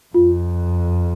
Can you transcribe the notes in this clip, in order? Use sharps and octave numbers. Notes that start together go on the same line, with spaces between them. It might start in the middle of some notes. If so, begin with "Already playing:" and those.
F2 F4